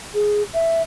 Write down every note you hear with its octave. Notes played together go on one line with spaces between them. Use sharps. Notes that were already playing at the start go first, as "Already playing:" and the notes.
G#4
E5